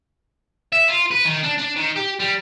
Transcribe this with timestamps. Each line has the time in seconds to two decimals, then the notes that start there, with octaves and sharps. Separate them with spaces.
0.73 E5
0.88 F4
1.11 B4
1.25 D#3
1.43 D4
1.58 D4
1.76 D#3
1.96 G4
2.20 G3